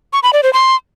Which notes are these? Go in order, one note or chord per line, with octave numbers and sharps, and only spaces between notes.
C#6
B5
D5
C5
C6